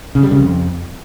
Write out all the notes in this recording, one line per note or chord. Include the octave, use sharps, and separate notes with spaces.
C#3
G3
C#3
F2